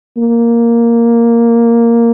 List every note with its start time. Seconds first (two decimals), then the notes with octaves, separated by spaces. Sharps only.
0.17 A#3